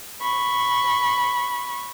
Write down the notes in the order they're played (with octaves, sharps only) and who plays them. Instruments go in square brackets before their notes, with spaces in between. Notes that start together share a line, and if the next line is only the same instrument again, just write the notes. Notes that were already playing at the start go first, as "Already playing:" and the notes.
[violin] B5 C#6